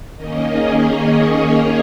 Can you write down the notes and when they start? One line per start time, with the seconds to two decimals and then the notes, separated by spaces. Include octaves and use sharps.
0.16 D#3 A#3 C#4 D#5
0.51 G#4
0.86 C#5
1.19 C#5